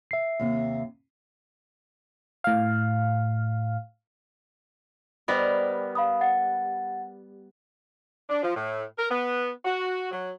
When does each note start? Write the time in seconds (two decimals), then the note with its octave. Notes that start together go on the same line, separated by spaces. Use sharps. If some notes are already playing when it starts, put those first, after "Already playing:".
0.11 E5 C7
0.39 D#2 C3
2.44 A2 F5
5.28 G3 B3 A#4 C5 D#5 B5
5.95 F5 B5 D#6
6.21 F#5 A6
8.30 D4
8.43 F3
8.55 A2
8.98 A#4
9.11 B3
9.65 F#4
10.11 F#3